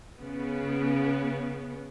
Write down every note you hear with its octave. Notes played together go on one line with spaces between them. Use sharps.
C#3 B3